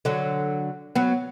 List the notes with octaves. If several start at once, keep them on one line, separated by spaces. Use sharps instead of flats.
D3 F#3
F#3 B3